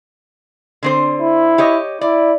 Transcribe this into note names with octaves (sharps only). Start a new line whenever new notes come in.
D3 C4 C5
E4
G4 C#5 D#5
E4 D5